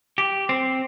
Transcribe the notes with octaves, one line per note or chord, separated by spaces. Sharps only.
G4
C4